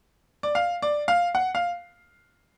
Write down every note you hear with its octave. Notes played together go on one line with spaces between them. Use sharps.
D5
F5
D5
F5
F#5
F5